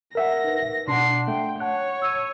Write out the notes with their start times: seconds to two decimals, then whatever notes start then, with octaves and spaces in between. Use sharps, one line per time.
0.15 A#4 E5 F#5 A#6
0.44 D#4 B4
0.88 B2 D4 F#5 A5 C6 C7
1.28 A3 G5
1.60 C#5 F#5 A5 F#6
2.02 E6 G#6 D#7